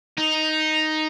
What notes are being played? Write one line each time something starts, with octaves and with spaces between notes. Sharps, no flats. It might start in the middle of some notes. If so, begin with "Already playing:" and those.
D#4